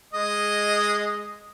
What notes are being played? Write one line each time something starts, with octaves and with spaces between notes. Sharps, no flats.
G#3 D#5